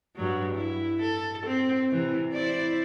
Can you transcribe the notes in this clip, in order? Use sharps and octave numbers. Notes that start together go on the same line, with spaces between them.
G2 F#3
E4
A4
C4
C3 E3
E4 C5 D5